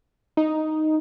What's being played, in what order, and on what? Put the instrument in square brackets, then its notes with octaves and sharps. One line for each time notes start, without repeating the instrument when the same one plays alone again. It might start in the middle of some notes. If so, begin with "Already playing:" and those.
[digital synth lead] D#4